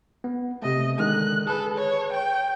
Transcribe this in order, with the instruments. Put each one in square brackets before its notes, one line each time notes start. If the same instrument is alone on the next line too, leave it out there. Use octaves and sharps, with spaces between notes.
[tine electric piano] B3
[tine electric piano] C3 A3 [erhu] D#5
[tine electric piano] D3 D#3 G#3 [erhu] F#6
[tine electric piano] G#4 B4 [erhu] A4
[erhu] C#5
G5